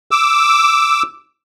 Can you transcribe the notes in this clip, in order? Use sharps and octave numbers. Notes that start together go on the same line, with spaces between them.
D6 E6